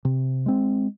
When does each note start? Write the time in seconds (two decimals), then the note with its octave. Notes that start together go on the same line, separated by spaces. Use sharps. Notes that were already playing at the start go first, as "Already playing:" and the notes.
0.05 C3
0.46 G#3 C4